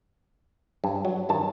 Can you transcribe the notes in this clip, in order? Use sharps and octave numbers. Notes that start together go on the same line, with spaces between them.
G2
F#3
G2 D#3 A5